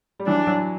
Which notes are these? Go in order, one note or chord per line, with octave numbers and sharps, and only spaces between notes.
G3
E3 F#3 D4
E3 F#3